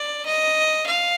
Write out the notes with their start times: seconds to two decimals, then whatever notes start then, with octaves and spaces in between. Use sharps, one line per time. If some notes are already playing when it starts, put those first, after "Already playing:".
Already playing: D5
0.26 D#5
0.86 F5